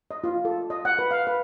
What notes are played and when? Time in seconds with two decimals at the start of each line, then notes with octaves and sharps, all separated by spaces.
0.11 D#5
0.24 F4
0.45 A4
0.70 D#5
0.85 F#5
0.99 B4
1.11 F5
1.27 B4